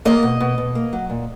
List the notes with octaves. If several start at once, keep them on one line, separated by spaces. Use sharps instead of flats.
A#3 D#5
B2
B2
B2
A#3
F#3
A#2